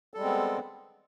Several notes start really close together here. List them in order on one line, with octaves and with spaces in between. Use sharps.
A4 G3 G#3 C4 B3